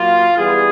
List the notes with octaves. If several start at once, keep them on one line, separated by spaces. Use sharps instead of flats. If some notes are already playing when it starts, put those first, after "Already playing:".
Already playing: A#2 F#3 A#3 F4
E3 G3 B3 G#4